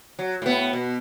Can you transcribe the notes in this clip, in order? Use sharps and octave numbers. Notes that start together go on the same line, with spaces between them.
F#3
A2 B3
B2